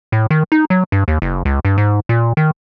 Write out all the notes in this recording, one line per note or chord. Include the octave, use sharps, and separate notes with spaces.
A2
D#3
D#4
F#3
G2
D#2
F#1
C#2
G2
G#2
A#2
D#3